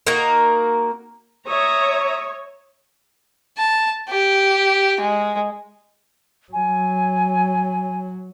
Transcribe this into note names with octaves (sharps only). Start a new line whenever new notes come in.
A#3 D#4 F#4 A#4
C#5 E5 A#5 D#6
A5
G4
G#3
F#3 G#5